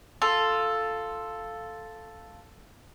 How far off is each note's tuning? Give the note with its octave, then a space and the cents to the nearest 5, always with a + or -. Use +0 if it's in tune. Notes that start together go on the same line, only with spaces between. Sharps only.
F4 +0 A4 +0